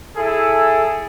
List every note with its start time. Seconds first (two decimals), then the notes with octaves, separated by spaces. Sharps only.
0.16 E4 G#4 A4